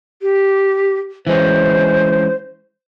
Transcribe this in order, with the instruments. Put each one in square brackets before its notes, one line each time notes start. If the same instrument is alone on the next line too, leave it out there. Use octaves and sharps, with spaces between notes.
[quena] G4
[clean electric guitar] E3 G#3 C#4 [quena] C5